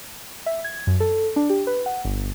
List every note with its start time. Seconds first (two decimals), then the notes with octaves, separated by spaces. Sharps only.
0.46 E5
0.64 G#6
0.87 F#2
1.00 A4
1.36 D4
1.50 G4
1.67 B4
1.86 F#5
2.05 G1